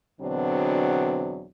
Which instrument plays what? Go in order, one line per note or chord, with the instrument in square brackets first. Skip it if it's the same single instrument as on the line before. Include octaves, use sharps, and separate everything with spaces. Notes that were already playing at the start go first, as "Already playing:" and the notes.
[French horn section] E2 B2 D3 F#3 C4 D4